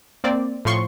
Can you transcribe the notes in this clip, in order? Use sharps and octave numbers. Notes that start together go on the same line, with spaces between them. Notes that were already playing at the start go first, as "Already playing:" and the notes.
A#3 C4 D5
A2 F3 C6 C#6